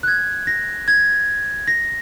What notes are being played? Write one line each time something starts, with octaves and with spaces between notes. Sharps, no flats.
F#6
G#6
A#6
G#6
A#6